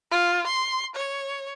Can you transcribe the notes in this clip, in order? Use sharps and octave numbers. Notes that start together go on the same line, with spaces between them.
F4
C6
C#5